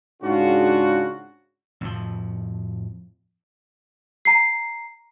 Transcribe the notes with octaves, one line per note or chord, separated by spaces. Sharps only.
G#2 C#3 D4 F4 F#4
F2 A2 F3
A#5 C7